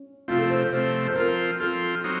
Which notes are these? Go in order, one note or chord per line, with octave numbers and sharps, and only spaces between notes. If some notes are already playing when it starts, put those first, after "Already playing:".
Already playing: C#4
C3 F3 A3 C4 F4
A4
C5
C5
C3 F3 A3 C4 C5
C5
F3 C4 F4 A#4
F3 C4 F4 A4
F#3 C4 D#4